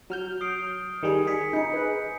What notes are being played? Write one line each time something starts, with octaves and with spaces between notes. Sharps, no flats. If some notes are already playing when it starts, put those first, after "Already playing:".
F#3 F6 G6
D#6 C7 D7
D#3 G3 G#4
G#4 B6 C#7
D#4 G6 C#7
B4